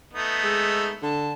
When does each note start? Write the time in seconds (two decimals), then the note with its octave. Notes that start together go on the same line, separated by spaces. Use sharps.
0.13 A3 B3 D#4
0.44 G#3 E6
1.02 D3 A5